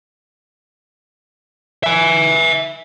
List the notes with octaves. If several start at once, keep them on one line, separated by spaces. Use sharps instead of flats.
E5 G#5